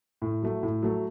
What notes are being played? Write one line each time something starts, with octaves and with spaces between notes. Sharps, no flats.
A2
F#3 A3
A2
F#3 A3